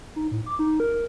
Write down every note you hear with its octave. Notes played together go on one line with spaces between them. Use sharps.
D#4
A2
D6
D#4
A#4